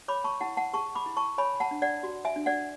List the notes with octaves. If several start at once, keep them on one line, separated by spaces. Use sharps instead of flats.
C#5 B5 D6
A5 C#6
E4 F#5 A5
F#5 A5
G#4 A5 C#6
B5 D6
E4
A5 C#6
C#5 G#5 B5
F#5 A5
D4
D5 F#5
F#4
E5 G#5
D4
D5 F#5